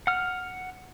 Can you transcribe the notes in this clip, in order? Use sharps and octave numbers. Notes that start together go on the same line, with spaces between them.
F#5 F6